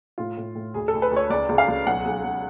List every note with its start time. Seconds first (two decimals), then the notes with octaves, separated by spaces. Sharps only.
0.18 A2 F4
0.37 A2
0.55 A2
0.74 D2 G#4
0.88 A4
0.94 D2
1.02 B4
1.11 D2
1.16 C#5
1.30 C#2 D5
1.49 C#2
1.58 F5
1.68 C#2
1.87 B1 F#5
2.05 B1
2.24 B1